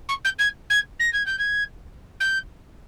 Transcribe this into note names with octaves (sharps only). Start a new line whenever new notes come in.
C#6
G6
G#6
G#6
A#6
G#6
G6
G#6
G6